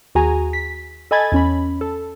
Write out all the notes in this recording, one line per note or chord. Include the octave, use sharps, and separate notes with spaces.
D#2 F#4 G#4 G#5 A#5
B6
A4 D#5 G#5 B5 G#6 A6
E2 C#4 B5
A4